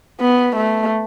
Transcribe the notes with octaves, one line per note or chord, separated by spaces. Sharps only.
B3
A3